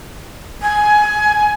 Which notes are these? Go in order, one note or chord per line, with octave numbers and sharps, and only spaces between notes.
G#5